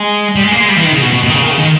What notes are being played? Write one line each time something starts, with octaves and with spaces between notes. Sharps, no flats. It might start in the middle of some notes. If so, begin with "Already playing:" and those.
Already playing: G#3
G3
G#3
A#3
G#3
G3
E3
D#3
C#3
B2
B2
B2
D#3
C#3
D#3
C#3
D#3